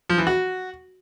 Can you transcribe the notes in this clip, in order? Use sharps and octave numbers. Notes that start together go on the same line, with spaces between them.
F3
E3
F#4